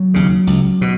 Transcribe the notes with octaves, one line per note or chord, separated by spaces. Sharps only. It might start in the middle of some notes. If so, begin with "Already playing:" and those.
Already playing: F#3
D#2 C#3
C#2
B2